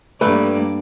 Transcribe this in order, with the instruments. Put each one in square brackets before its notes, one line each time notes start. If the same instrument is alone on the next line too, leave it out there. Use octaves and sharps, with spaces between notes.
[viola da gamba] G2 A#3 D5 [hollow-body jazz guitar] A3 B4